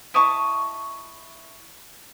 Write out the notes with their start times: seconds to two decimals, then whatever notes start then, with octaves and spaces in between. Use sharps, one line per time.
0.14 E4 D#5 A5 C#6